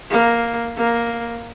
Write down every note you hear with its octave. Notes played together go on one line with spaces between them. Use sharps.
A#3
A#3